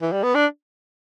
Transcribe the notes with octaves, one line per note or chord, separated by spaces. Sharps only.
E3
G3
B3
D4